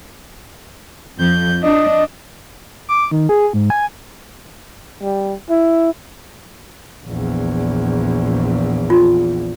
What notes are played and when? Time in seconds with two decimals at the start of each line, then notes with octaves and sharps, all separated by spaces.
1.18 F2 F3 G6
1.63 D4 D#5
2.89 D6
3.11 D#3
3.29 G#4
3.53 G#2
3.70 G#5
5.03 G3
5.50 E4
7.06 A#1 E2
8.90 F4